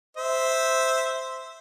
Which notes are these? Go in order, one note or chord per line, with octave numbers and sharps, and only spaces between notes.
C5 E5